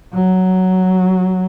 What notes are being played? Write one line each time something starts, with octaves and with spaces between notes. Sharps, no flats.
F#3